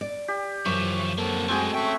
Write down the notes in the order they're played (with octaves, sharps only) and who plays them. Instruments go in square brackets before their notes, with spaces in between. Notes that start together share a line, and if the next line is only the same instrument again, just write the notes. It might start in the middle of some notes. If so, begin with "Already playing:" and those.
[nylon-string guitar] D5
[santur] G4
[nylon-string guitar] F#2 [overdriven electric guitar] E3 F3 [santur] C#6
[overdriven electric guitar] A#3 C4 [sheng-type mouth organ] A4
[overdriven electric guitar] G#3 A3 [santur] C4 F#4 G#4
[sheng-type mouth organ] A3 E5 C#6 [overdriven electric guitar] C#4 G5